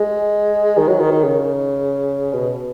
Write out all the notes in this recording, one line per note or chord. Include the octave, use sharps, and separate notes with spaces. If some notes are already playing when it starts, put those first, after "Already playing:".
Already playing: G#3
D#3
F#3
D#3
D#3
C#3
B2